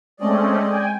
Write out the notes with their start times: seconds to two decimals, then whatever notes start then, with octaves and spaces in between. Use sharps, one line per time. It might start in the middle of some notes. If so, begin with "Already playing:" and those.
0.20 G#3 A3 C4 C#4 D5 D#5
0.65 G5 G#5